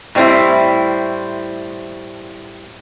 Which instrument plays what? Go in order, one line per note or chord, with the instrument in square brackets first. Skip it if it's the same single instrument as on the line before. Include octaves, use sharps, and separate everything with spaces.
[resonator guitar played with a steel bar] A2 G3 C4 D4 E4